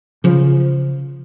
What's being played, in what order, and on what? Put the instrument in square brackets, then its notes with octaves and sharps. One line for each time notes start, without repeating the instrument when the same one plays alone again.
[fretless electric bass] C#3 F3